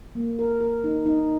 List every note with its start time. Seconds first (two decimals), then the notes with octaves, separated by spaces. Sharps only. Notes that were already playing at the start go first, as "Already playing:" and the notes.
0.15 A#3
0.39 A#4
0.61 A#4
0.84 D#4
1.06 D#4